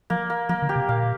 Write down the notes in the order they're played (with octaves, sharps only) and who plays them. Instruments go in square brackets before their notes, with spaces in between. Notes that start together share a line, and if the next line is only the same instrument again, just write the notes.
[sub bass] F3 [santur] A#3
[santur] A#3
[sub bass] F3 [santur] A#3
[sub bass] D3
[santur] G4
[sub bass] C3
[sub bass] A#2 [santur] F5